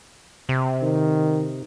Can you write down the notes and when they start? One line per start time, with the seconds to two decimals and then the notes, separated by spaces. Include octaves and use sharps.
0.49 C3
0.83 D#3